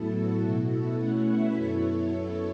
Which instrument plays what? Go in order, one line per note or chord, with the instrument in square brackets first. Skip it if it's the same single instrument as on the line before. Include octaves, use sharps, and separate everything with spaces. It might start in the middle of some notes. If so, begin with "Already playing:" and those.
Already playing: [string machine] A2 F#3 B3 E4 A4
F#4
B2 B3 E4
A4
B2 A3 C#4 E4 C#5 F#5
B4 E5
F#2 F#3 B3 E4 A4 C#5